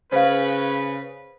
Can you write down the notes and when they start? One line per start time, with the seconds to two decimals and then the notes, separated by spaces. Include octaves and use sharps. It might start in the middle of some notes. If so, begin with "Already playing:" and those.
0.12 C#3 B4 C5 F5